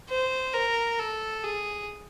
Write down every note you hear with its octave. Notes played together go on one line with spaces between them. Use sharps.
C5
A#4
A4
G#4